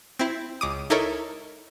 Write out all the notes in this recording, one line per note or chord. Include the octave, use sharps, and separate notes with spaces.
C4 E4
C#2 D6 D#6
D#4 E4 A4 A#4 C#5